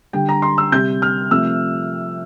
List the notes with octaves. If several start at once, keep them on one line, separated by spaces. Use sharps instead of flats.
D3 G3 G5
A#5
C6
E6
C3 G3 G6
F6
C3 F3 A3 E6